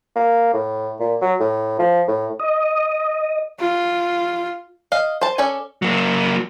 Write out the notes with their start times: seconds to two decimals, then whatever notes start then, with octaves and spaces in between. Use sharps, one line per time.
0.16 A#3
0.53 A2
1.00 A#2
1.22 F#3
1.40 A2
1.79 F3
2.08 A2
2.40 D#5
3.60 F4
4.92 D#5 F5
5.21 C5 A5
5.38 C#4 A4 D5 G#5
5.82 F#3 A#3